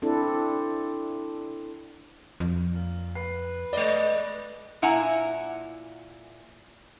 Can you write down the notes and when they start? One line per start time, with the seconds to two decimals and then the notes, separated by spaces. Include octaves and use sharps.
0.02 C4 D4 E4 A4
2.40 F2
2.73 A#2
3.15 B4 C7
3.73 G#3 D5 D#5
4.82 A#2 E4 F#5 G#5 A#5